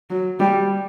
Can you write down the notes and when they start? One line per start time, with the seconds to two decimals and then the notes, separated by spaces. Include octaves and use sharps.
0.10 F#3
0.40 G3